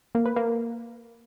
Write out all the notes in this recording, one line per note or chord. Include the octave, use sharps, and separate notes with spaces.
A#3
B4
A#3